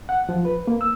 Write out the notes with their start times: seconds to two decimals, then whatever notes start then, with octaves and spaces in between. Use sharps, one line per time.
0.09 F#5
0.29 F3
0.45 B4
0.67 A#3
0.81 E6